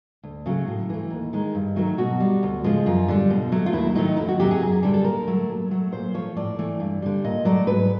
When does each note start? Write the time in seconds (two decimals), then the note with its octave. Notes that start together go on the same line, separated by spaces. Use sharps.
0.23 D2
0.46 C#3 F#3 A3
0.67 A2
0.90 E3 A3
1.11 D#2
1.33 D#3 G#3
1.55 G2
1.76 D#3 F#3 A3
1.98 B2 F#4
2.20 G3
2.43 D2
2.64 C#3 F3 G#3
2.86 F#2 F4
3.08 D3 G3
3.30 B2
3.52 F#3 A3
3.66 F4
3.73 D#2 E4
3.95 D#3 F#3 A3 D#4
4.17 F2 E4
4.28 F#4
4.40 C3 D#3 F#3 G4
4.51 G#4
4.61 F#2 G#4
4.83 D3 G3 A4
4.94 A4
5.05 A#2 A#4
5.27 F#3 A3
5.49 A#2
5.71 F#3 A3
5.92 A#2 C5
6.14 F3 A3 C#5
6.36 A2 D5
6.59 E3 A3
6.80 G2
7.02 D3 G3
7.24 A#2 D#5
7.45 F#3 A3 D5
7.67 G#2 B4